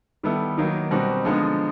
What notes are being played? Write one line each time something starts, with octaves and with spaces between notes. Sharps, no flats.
D#3 G3 B3 E4 A4
D#3 F#3 A#3 D#4
B2 G3 C4 D#4 F#4
D3 F3 G#3 B3 D#4